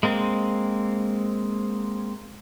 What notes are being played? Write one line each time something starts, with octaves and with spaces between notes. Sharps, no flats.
G#3 A#3 C4